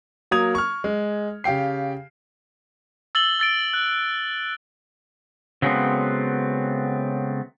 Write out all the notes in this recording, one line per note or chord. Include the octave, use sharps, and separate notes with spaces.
F#3 A#3 A#4 D#6 G#6 F7
C#6 F6
G#3
C#3 G4 F5 G5 C7
E6 A6 F#7 G7
E6 A6 D7
F#6
C#3 F#3 G#3 A3 B3 C4